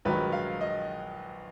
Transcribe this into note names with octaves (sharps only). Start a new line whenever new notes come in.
A#1 G#2 D#3 F#3 B4
F5
D#5